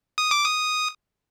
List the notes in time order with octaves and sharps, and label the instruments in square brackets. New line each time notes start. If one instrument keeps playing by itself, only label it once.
[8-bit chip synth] D#6
D6
D#6